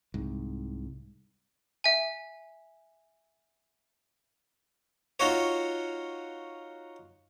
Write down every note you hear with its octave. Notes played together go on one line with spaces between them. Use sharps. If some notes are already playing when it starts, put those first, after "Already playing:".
C2 G#2
E5 G#5
D#4 F4 F#4 C#5